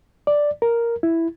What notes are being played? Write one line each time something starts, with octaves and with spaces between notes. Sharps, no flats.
D5
A#4
E4